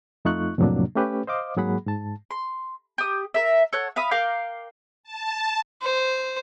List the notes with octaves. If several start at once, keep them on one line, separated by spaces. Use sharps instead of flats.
F2 A3 D#4 F4 C#6 F#6
F2 A2 C3 F#3 A#3 D4
A3 C#4 G4 B4
C5 D#5 F5 D6
G#2 F#3 A#3 G#4 F#5 B5
G#2 A5
C6
G4 D#6
A#4 E5
A4 C#5 F#5
E5 F5 B5 D#6
A#4 F5 G5 D6
A5
C5